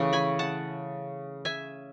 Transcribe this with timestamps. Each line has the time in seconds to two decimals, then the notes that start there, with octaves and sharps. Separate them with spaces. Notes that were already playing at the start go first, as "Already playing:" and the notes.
Already playing: C#3 E3 A3
0.13 G#5 B5
0.39 F#5 A5
1.45 E5 G#5